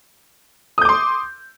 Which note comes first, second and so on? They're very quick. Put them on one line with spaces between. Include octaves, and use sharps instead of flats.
D#6 G6 D6 C6